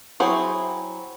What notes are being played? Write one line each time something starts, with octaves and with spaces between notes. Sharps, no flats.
F#3 C4 E4 G#4 C5